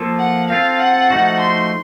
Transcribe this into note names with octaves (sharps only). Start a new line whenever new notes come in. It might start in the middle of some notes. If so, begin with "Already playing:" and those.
Already playing: F3 A#3 F4 A4
F#5
C4 F4 A4 F5
F#5
F3 A3 D#4 F#4
C6